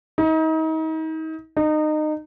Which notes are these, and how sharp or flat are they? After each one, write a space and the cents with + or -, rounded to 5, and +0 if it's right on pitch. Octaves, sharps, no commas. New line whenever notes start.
D#4 +35
D#4 -25